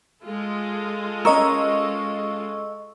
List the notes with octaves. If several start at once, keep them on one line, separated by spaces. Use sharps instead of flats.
G#3 F4 A4
C#4 A#4 D#5 C#6 E6